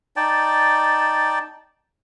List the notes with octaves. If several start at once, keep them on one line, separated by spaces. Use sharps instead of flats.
D#4 D5 G5 A5